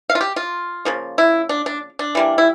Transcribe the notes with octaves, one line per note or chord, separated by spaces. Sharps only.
F5
F4
G4
F4
C#3 F3 A#3
E4
D4
D4
D4
E3 G3 A#3
E4